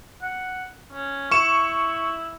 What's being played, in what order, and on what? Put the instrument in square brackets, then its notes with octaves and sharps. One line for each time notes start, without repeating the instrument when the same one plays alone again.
[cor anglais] F#5
C#4
[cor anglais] E4 [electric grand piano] C#6 E7